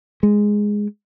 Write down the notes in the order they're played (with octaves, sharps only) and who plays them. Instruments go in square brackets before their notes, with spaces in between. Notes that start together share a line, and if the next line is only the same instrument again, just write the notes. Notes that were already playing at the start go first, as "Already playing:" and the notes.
[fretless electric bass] G#3